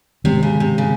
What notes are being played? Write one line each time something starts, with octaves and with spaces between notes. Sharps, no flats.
C3 D#3 G#3 C4
C#3
C3
C#3